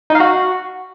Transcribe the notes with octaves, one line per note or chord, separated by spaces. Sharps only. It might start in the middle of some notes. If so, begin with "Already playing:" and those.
D#4
F5
F#4